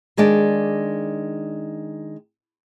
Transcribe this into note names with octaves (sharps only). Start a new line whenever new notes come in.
D#3 G#3 D4 D5